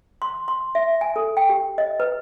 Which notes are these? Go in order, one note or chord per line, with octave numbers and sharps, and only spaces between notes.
C6
C6
E5
G#5
A4
G5
G4
D#5
B4